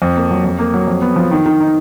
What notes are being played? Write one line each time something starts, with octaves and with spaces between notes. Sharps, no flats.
F2
A#3
F#3
F2
A#3
F#3
F2
B3
F3
D#3
D#3
D#4